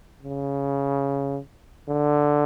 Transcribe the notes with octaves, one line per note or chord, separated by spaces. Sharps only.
C#3
D3